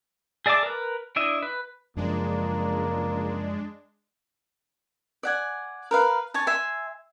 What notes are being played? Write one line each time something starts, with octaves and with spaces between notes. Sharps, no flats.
G#4 D5 E5 A5 D6
A#4 B4
D4 E4 D#5 E5
B4
C#2 F#2 F3 G#3 A#3 D4
D5 F#5 G#5
A#4 B4 F5
C#5 G#5 A5
E5 G#5 C6